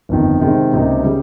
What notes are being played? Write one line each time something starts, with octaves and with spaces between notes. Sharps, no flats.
G1 F2 D#3
C3 D#3 G#3 C4
C#2 C3 G3 A#3 D#4
C#3 G3